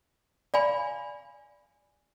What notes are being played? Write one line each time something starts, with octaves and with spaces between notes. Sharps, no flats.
D5 F5 G#5 B5